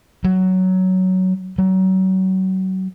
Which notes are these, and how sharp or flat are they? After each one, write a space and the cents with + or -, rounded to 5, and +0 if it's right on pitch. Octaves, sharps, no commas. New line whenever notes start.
F#3 +10
F#3 +30